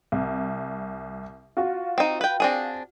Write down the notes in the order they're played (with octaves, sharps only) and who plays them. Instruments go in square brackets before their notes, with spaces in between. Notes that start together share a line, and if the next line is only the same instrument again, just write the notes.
[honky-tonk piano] C2
F4 F#4
[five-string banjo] C4 D#4
B4 G5
C4 D4 G#4